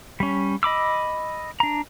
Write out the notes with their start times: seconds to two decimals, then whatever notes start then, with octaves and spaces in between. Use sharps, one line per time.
0.20 G3 C#4
0.63 D#5 B5 D6 E6
1.60 D4 A#5